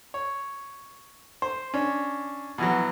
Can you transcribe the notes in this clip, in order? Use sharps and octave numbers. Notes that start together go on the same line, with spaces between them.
C#5
C5
C#4 D4
B2 E3 F#3